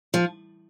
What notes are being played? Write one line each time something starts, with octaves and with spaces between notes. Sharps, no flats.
F3